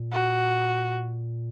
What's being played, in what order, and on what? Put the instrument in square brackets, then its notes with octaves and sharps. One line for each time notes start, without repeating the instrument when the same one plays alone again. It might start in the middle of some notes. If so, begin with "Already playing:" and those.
Already playing: [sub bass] A#2
[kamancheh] F#4